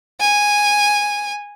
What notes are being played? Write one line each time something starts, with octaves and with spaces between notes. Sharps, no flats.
G#5